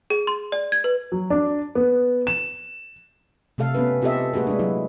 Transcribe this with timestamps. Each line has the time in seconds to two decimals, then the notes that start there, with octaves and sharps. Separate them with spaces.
0.10 G#4
0.27 C6
0.52 D5
0.72 G#6
0.84 B4
1.12 F#3
1.30 D4
1.75 B3
2.27 E7
3.58 C3 A3 A4 F5
3.74 B3 C#4 B4
4.02 C4 F4 G4 A4 D#5 E5
4.34 A3 A#3 F#4 G#4 B4
4.47 G#3 D4
4.59 F#3 E4